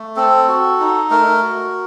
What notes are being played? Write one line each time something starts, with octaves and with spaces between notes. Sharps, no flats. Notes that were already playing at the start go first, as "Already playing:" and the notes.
Already playing: A3
C4 A4
F#4
D#4
A3 A#4
F#4